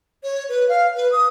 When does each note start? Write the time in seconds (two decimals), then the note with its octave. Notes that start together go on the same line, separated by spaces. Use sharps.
0.24 C#5
0.49 B4
0.69 F5
0.96 B4
1.12 D#6